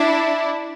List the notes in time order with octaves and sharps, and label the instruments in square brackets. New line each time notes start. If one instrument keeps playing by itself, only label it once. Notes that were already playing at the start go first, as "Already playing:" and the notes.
Already playing: [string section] D4 E4